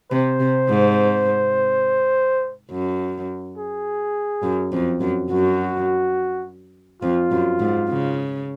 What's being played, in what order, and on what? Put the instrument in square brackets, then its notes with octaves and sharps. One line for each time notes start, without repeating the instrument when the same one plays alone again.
[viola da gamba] C3 [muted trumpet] C5
[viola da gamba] C3
G#2
F#2
[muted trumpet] G#4
[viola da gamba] F#2
F2
F#2
[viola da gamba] F#2 [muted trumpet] F#4
[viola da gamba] F2 [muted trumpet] F4
[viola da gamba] F#2
G#2
C#3